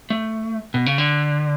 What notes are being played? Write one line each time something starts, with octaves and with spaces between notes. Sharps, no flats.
A3
B2
C#3
D3